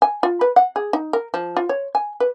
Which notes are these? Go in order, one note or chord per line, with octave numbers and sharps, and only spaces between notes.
G#5
F4
B4
F#5
G#4
D#4
A#4
F3
F4
C#5
G#5
B4